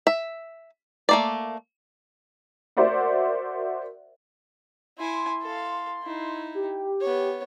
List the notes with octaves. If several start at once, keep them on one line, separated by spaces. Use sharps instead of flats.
E5
A3 A#3 D5
F#4 A#4 C5 D5 E5 F#5
E4 G#5 C6
A4 F5
D#4 E4
G4
B3 C#5